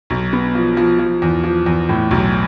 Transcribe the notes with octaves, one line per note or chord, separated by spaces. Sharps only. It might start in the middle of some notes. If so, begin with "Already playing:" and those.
B1
B3
F3
F3
F3
E2
F3
E2
A2
B1